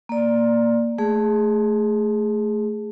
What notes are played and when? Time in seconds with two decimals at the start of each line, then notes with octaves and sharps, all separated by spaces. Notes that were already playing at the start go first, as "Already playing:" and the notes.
0.09 A#3 D5
0.98 A3 G#4